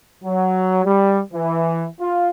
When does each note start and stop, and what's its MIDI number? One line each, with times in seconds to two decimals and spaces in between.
0.24 0.82 54
0.85 1.20 55
1.34 1.86 52
1.99 2.28 65